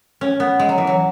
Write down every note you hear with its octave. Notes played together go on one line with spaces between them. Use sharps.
C#4
B3
G#3
F#3
E3
F#3